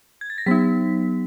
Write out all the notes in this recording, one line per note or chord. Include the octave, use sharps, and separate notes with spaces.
G#6
A6
A#6
F#3 B3 D#4 B6